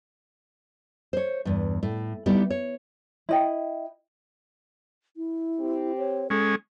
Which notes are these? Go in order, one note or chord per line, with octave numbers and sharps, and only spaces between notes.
C5 C#5
E2 G2
A2
G3 B3 D#4 E4 G4
C#5
E4 D#5 G5
E4
C4 G4
C#5
G#3 C#4 A4